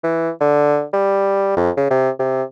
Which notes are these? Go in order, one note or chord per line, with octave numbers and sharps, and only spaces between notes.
E3
D3
G3
F2
C#3
C3
C3